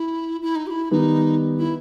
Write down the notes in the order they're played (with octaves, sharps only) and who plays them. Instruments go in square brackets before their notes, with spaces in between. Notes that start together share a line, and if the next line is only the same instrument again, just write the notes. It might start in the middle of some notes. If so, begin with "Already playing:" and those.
Already playing: [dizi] E4
E4
D#4
G4
E4
[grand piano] D#3 G3 B3 [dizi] D#4
[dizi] E4